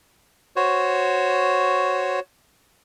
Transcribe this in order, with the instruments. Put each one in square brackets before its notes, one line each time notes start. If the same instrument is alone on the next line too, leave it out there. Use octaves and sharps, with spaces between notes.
[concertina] F#4 C5 C#5